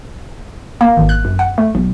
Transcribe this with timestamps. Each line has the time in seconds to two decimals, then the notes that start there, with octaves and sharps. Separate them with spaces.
0.81 A#3
0.97 G#1
1.09 F#6
1.25 F#2
1.39 F#5
1.58 A3
1.75 B1